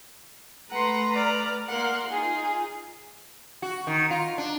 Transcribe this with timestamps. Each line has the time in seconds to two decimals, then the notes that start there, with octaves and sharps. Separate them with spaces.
0.71 A3 B4 F#5 A#5 C6
1.14 D5 F6
1.68 A#3 A#4 F5 F#5 C6
2.11 D#4 F4 G#4
3.62 F#4
3.87 D#3
4.10 F4
4.38 D4